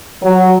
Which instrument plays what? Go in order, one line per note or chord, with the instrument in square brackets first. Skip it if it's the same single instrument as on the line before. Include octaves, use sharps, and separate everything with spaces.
[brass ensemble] F#3